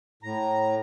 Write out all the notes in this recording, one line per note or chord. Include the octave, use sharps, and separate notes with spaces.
A2 A#5